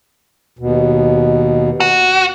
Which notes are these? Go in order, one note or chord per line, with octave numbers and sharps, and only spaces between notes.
D#2 B2
F#4